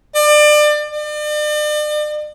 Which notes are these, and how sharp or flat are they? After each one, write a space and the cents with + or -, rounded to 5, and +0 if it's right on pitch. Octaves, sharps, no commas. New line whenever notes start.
D5 +30
D5 +40